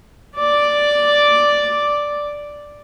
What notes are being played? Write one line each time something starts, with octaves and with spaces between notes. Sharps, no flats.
D5 D6